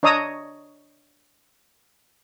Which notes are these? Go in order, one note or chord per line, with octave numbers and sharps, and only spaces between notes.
D4 C#5 D#5 A#5 D#6 E6